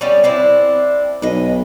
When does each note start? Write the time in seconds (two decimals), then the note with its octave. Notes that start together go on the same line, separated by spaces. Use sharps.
0.01 G3 B3 C#4
0.24 C4 D4 E4
1.22 B1 B4 D#5